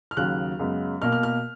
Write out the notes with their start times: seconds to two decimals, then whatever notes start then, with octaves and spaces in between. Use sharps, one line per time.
0.11 F6
0.17 D#2 C#3 F#3 F#6
0.59 F#2 C#3 G#3 B3
1.02 B2 A#3 F6
1.12 F6
1.23 F6